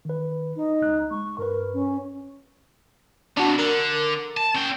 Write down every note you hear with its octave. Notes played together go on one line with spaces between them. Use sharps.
D#3 B4
D#4
C#2 F#6
G#3 C#6
G2 A#4 B4
C#4
F2 B2 D4 F#4
D3 A#4
A5
C#4 G5